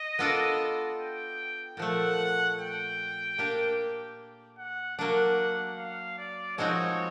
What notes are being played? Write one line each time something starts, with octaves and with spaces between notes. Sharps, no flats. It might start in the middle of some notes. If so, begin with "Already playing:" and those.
Already playing: D#5
B3 D4 F4 A4 D5
G5
A#2 F3 A3 F#5
G5
A#3 D4 G4
F#5
F#3 A#3 D4 F#5
F5
D5
F3 G#3 C4 D#4 F#4 C#5